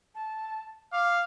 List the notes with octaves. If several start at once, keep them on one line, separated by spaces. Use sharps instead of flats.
A5
F5 D6